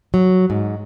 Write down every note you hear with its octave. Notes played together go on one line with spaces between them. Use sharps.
F#3
G#2